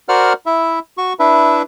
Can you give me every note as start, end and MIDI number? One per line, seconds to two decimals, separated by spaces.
0.09 0.33 66
0.09 0.33 70
0.09 0.33 72
0.09 0.33 74
0.09 0.33 78
0.09 0.33 89
0.46 0.79 64
0.46 0.79 76
0.98 1.13 66
0.98 1.13 85
1.19 1.62 62
1.19 1.62 64
1.19 1.62 71
1.19 1.62 76